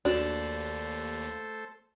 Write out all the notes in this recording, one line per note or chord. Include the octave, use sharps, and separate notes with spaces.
D#2 A3 D4 F#4 A4 C5